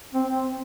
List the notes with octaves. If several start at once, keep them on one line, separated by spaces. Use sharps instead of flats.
C4